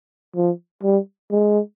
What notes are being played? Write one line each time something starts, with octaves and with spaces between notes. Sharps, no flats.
F3
G3
G#3